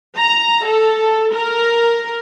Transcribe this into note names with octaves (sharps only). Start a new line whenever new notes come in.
A#5
A4
A#4